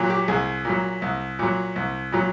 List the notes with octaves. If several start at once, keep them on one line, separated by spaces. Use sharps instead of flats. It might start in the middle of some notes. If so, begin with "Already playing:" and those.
Already playing: A#2 F#3
G4
C2 G#4
A#2 F#3
C2
A#2 F#3
C2
A#2 F#3